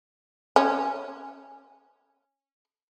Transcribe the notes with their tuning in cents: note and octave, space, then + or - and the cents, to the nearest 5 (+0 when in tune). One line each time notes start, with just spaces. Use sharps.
C#4 -15